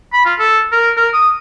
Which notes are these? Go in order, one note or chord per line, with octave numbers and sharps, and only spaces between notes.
B5
F4
A4
A#4
A#4
D#6